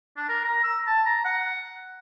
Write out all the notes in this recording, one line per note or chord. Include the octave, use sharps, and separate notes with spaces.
D4
A#4
A#5
E6
A5
A#5
F#5